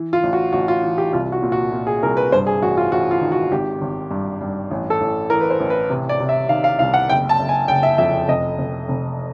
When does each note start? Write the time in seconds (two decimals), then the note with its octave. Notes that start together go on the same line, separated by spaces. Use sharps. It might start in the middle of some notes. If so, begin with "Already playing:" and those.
Already playing: E3
0.13 F4
0.23 A1
0.33 F#4
0.53 A1 F#4
0.68 F4
0.83 E3
0.98 G4
1.13 C2 F4
1.32 F#4
1.42 A#2
1.52 F#4
1.72 A#2
1.87 G#4
2.03 C2 A#4
2.17 B4
2.32 G2 C5
2.47 G#4
2.62 A1 F#4
2.77 F4
2.92 A1 F#4
3.11 F4
3.21 D#3
3.32 F#4
3.52 G#1 G4
3.81 G#1
4.11 G2
4.41 G2
4.71 A1
4.90 A4
5.01 A1
5.30 E3 A#4
5.41 B4
5.50 C5
5.60 A1
5.70 B4
5.90 C3
6.09 D5
6.20 C3
6.29 E5
6.49 D#3 F5
6.64 F5
6.79 C2 F5
6.94 F#5
7.09 F#1 G5
7.29 A5
7.39 F#1
7.49 G#5
7.68 F#1 G5
7.83 E5
7.98 F2 E5
8.28 F1 D#5
8.58 F1
8.88 F1